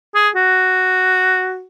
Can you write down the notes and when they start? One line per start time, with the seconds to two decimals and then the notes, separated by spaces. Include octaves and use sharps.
0.15 G#4
0.35 F#4